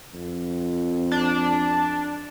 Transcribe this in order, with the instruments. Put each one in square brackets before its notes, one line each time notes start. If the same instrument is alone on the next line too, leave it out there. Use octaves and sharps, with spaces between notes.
[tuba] F2
[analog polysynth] D4